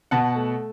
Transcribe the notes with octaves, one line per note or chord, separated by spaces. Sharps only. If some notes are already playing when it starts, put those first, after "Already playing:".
B2 F#5 A5
A3